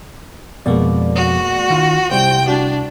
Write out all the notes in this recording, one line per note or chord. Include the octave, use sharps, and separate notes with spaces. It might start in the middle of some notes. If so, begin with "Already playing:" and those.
F2 B2 G#3 A#3 D5
F#4
D#3 F4
C2 G3 C5 G5
D4 F#4